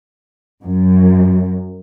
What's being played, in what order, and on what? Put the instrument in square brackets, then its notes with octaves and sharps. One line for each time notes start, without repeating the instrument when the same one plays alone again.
[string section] F#2